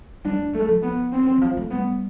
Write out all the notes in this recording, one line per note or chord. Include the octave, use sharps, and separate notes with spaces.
G3 D4
A3
G3 A3
F3
B3
C4
E3
F3
A3
G3 B3